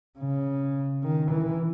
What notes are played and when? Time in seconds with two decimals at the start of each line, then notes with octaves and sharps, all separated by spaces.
0.19 C#3
1.03 D#3
1.31 E3